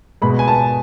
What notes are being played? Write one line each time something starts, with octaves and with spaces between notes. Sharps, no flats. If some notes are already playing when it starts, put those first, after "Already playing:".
B2 G#3 B5
G#5
A5